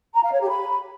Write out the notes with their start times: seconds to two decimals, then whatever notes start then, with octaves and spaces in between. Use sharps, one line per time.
0.14 A#5
0.23 F5
0.31 C#5
0.40 G4
0.49 B5